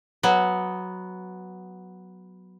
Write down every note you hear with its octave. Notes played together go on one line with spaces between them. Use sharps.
F#3 B3